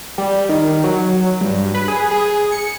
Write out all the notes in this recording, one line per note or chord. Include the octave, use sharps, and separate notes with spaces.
G3
D#3
F#3
G2
B4
G#4
G#4
C#7